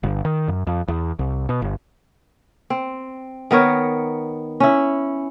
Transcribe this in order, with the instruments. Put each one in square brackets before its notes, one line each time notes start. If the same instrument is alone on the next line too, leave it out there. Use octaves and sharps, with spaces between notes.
[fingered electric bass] G1
D#3
F#2
F2
E2
C2
B2
G1
[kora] C4
D#3 B3 A#4 C#5
C#4 E4